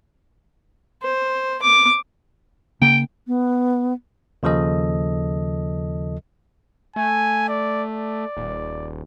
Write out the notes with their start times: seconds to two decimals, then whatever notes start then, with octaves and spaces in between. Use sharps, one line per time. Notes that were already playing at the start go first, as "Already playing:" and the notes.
1.03 C5
1.62 D6
2.81 C#3 A#3 G5
3.27 B3
4.43 D#2 C#3 F3 A4 D#5
6.96 A3 G#5
7.49 D5
7.90 D5
8.37 D#1